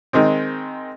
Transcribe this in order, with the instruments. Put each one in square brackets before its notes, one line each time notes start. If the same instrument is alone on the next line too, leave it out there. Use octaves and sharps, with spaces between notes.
[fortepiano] D#3 G#3 C4